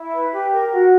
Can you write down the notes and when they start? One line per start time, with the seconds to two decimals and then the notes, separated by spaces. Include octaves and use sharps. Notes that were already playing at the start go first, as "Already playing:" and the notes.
Already playing: E4
0.13 B4
0.33 G4
0.52 A#4
0.71 F#4